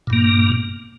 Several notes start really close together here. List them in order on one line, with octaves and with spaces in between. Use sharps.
A#2 G2 A#3